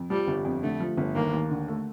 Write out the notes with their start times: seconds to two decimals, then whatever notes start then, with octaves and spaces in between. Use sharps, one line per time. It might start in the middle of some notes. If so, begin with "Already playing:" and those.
Already playing: F2
0.10 F3 G3
0.27 G1
0.45 F2
0.63 D3 A3
0.81 F3
0.97 G1
1.15 D#2 A#3
1.33 D#2
1.51 D3
1.68 A3